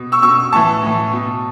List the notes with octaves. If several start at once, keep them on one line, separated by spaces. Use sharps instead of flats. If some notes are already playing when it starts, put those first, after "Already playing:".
Already playing: B2
C#6 E6
B2 C#6 E6
A2 E3 A5 C#6
A2 E3
B2